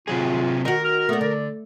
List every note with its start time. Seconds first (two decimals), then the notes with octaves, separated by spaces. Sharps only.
0.08 C3 F#3 F4 G#4
0.65 D#3 F#4 A#4
0.84 F6
1.09 A3 B3 D5
1.21 D3 D5